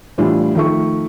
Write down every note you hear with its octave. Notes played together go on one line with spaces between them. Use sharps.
A2 E3 G3 D4 F4
D#3 F3 A3 C#6